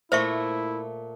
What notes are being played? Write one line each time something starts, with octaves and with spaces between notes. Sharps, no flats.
A#2 A3 E4 C5 E5 C#6